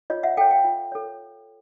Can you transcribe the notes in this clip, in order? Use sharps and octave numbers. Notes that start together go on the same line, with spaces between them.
F4 C#5 D#5
E5 F#5
A4 C#5 F5 G5
F5 G5
F4
A4 C#5